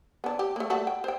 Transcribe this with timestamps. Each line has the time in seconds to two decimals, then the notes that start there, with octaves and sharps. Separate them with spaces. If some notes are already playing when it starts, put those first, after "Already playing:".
0.24 B3 D4
0.39 G4
0.56 A3 A#3
0.70 G3 A3 F#4
0.87 G5
1.04 C5 G5